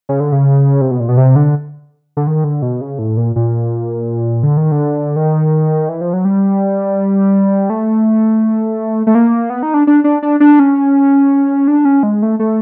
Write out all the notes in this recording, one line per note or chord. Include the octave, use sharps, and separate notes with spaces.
C#3
D3
C#3
C3
B2
A#2
B2
C3
D3
D3
D#3
D3
B2
C#3
A2
A#2
A#2
D3
D#3
D3
D#3
E3
F3
F#3
G3
A3
A3
A#3
B3
D#4
D4
D4
D4
D4
D4
C#4
D4
C#4
G#3
A3
A3